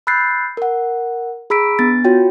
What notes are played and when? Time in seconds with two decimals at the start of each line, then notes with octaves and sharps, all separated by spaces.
0.07 B5 E6 F#6 G6 A6 C7
0.57 A#4 F#5
1.50 G#4 A#5 B5 E6 B6 D7
1.79 B3 D4 A6
2.05 F4 F#4 C#5 G5